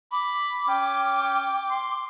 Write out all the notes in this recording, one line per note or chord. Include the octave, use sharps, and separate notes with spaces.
B5 D6
C#4 G5
C6